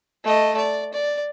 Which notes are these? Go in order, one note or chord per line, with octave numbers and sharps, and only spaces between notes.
A3 D#5
D5
D5